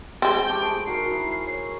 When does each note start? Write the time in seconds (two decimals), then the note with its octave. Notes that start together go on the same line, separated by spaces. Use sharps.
0.22 G#3 C4 G5
0.48 A3 G4 A4
0.61 G#4 C5 B5 D7
0.86 D#4 F#4 A#4 C7
1.11 E4
1.46 C#5